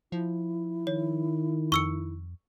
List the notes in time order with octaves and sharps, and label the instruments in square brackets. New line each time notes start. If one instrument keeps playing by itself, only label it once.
[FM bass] F3 [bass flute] E4
[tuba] D#3 [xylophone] C#5
[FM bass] F2 [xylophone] C#6 E6 C#7